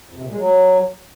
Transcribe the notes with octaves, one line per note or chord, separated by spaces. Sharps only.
F2
C3
A#2
G#3
F#3